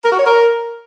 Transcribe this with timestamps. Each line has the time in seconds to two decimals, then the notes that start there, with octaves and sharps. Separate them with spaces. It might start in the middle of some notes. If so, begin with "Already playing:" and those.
0.04 A#4
0.11 F#4
0.18 C#5
0.25 A#4